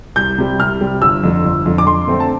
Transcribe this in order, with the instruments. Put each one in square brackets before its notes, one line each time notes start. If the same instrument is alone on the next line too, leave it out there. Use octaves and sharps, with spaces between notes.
[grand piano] C2 G6
C3 G3
C2 F6
C3 G3
G1 E6
F2 D3
G1
F2 D3
D6
F2 C6
D3 A3 C4
A5